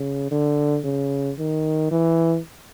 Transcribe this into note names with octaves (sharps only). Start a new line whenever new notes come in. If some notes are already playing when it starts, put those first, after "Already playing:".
Already playing: C#3
D3
C#3
D#3
E3